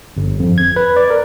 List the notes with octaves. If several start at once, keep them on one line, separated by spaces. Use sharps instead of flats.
G1
F2
G#6
B4
D5
A#4